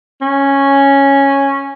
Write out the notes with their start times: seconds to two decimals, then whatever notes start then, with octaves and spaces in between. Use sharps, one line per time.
0.21 C#4